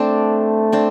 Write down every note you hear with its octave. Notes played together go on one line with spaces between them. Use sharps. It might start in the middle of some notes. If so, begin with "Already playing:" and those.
Already playing: A3 C4 D4
C4 D4